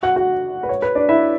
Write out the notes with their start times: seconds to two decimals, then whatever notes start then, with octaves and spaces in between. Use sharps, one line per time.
0.03 F#4 F#5
0.16 F#4 F#5
0.63 B4
0.69 C#5
0.82 B4
0.95 D4 D5
1.09 E4 E5